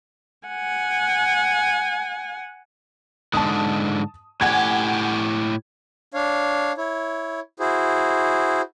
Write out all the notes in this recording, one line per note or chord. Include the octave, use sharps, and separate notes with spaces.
F#5 G#5
G#2 D3 A5 D#6
A2 G4 F#5 G#5 G#6
D4 C#5 F5
E4 C#5
E4 F#4 G#4 C5